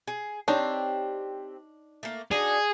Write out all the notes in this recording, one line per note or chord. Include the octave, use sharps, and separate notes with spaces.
G#4
C4 D4 D#4 G4 C#5
A3 A#3
D4 D#4 F#4 G#4